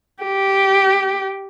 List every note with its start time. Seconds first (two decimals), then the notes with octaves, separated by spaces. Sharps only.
0.23 G4